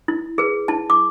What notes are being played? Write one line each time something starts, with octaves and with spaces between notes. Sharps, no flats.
E4
G#4 B4
E4 A5
D6